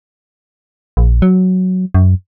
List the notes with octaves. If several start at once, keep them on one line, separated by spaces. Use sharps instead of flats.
A#1
F#3
F#2